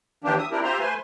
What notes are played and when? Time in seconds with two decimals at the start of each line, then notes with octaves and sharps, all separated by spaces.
0.24 D#2 D#3 E3 A#3 D4 G4
0.38 E5 D#6
0.51 C4 D4 E4 G4 A#4
0.63 F4 G4 C5 E5 A#5 C6
0.79 A3 B4 C5 G#5 C6